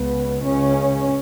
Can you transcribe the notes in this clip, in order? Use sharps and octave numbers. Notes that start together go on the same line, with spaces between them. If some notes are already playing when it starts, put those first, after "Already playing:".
Already playing: C#2 C#3 B3
C#2 C#3 C#4